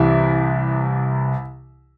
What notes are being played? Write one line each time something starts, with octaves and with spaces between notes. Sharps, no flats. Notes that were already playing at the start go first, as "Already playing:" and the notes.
Already playing: C2 C3 E3 E4